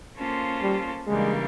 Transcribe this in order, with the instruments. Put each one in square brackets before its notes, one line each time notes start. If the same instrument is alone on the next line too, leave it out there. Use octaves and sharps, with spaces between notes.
[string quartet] A#3 C#4 F4 A4 C5
[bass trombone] G3
[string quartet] C#3 E3 G3 A#3 D4 [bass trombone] G#3